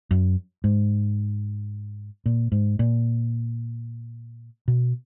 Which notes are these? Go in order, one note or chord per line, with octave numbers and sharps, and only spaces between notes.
F#2
G#2
A#2
G#2
A#2
B2